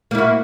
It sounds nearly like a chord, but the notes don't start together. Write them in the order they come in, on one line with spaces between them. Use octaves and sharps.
A#3 E4 F#4